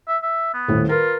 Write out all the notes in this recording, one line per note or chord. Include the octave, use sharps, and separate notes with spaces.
E5
E5
B3
D#1 A2
F4 A#4 B4